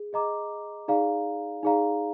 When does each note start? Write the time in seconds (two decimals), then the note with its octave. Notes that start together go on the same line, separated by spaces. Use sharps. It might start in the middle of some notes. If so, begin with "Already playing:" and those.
Already playing: G#4
0.13 G#4 D#5 A#5 D6
0.88 D#4 G#4 D5 F5 A#5
1.63 D#4 G#4 D5 F5 A#5